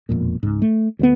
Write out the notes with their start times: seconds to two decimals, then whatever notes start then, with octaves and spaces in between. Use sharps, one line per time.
0.09 E1 F2 A#2
0.43 C#2 G#2
0.62 A3
0.99 D2 G3 B3